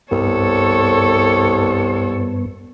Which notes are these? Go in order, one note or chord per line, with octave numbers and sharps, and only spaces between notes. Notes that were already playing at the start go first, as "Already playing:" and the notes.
C2 G2 B3 A4 C#5